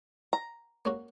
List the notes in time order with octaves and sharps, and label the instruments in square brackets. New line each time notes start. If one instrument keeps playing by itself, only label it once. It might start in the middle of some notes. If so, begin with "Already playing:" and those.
[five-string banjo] A#5
[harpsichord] A#3 C#4 F#4